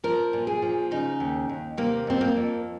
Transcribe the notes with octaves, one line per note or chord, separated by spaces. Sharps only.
F3 A#4
A#2
G#4
F3
C#3 D#4
D#2
D#2
C3 A#3
F2 C4
A#3
F2